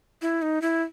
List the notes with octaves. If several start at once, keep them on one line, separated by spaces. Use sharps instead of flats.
E4
D#4
E4